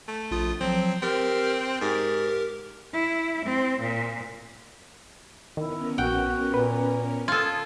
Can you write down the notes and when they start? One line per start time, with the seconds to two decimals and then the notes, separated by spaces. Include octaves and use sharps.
0.08 A3
0.31 A#1 F4 D#6
0.61 F3 F#3 C4
1.02 C4 G4 A#4 F6
1.81 G#2 G4 A#4
2.93 E4
3.45 C4
3.82 A#2
5.57 D#3 B3 C#4 E4 A#4
5.98 A#1 F#4 F#5 G5
6.54 A#2 B4
7.28 F4 A4 D#6 G#6